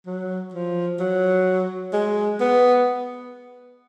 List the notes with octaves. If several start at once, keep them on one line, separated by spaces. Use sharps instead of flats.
F#3
F3
F#3
G#3
B3